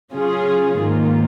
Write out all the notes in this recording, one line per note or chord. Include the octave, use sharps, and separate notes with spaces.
C#3 F#3 C#4 F4 G#4
G#2 D#3 A#3 F4